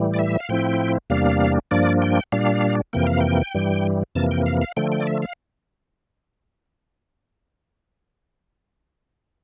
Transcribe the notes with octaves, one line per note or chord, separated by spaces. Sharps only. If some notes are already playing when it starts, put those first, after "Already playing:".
Already playing: A2 E3 G3
D5
E5
F5
A2 F3 C4 E4 G5
E2 C3 G3 A#3 D4 F5
G2 F3 A#3 D4 D5
G5
A#2 G3 D4 F5
F2 C3 E3 A#3 G5
F5
G5
G2 E3 G3
F2 C3 E3 A#3 A5
G5
F5
F5
D3 F3 A3 G5
G5
D5
E5
F5